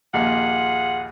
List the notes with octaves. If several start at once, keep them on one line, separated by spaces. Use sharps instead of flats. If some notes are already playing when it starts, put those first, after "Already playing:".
A#1 D#2 F4 G#4 F#5